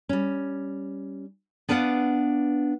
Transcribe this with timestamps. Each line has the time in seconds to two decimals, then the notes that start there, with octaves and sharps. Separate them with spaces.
0.09 G3 C#4
1.68 B3 D4 B4 F5 F#5